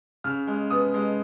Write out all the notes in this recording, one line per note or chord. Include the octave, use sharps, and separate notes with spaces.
C#3 F6
G#3
B3 D#6
G#3